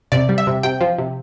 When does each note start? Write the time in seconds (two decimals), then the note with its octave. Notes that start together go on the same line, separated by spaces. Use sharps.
0.12 C3 D5
0.29 G3
0.38 E5
0.47 C3
0.63 C3 G5
0.81 F3
0.98 C3